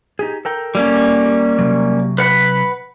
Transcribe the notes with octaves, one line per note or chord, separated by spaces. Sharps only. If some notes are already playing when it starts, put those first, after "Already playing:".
D#4 G4 G#4
A4 A#4 G5
G3 A#3 C#4
C3 F#3
B4 F#5 B5